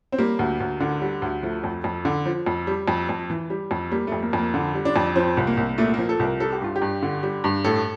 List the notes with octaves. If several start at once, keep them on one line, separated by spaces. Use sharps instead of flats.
C4
G3 A#3
D2
D2
D3
G3
D2
F3 A3
F2
F2
D3
F3
F2
G3
F2
F2
E3
G3
F2
G3 A#3
F2 A3
A#3
F2 A#3
D3
G3
D4
F2
F3 C4
C2
A#3
C2
A#2 A3
F3 A#3
A4
C2
A#4
G3 A4
G4
G2 F4
G4
G2
D3
G3
G2
A2 A4